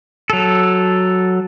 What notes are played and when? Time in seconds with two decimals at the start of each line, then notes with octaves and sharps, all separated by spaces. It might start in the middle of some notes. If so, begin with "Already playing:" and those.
0.30 F#3 A4